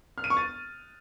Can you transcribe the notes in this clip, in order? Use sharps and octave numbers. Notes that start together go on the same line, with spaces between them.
F6
D#7
C#6
A6